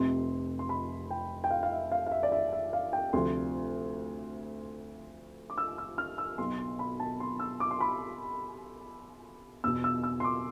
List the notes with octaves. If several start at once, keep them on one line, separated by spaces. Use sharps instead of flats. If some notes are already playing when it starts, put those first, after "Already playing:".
Already playing: F1 F2 C3 C6
C6
B5
G5
G5
F5
F5
E5
F5
F5
E5
D5
E5
E5
F5
G5
D2 C3 F3 C6
D6
E6
E6
F6
E6
B1 B2 C6
C6
B5
A5
C6
E6
D6
C6
B5
E2 B2 E6
E6
E6
C6
D6